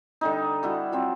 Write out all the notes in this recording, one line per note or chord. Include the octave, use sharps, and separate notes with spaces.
D3 G3 D#4
G3 E4 F#4
F3 F#3 C4